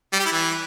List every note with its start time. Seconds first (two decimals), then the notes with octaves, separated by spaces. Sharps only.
0.13 G3
0.19 G4
0.26 E4
0.32 E3